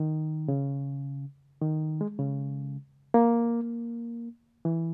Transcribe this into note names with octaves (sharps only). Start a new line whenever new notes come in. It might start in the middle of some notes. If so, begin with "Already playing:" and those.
Already playing: D#3
C#3
D#3
G#3
C#3
A#3
E3